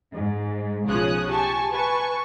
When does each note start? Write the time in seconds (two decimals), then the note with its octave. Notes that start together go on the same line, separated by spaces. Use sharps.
0.13 G#2
0.86 B1 C#3 F3 C#5 D#6 F#6
1.29 G4 G#5 A5 C#6
1.72 B4 G#5 A5 C#6